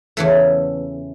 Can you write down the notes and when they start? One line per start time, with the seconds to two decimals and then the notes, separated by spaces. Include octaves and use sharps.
0.17 E2 C#3 E3 A3 A4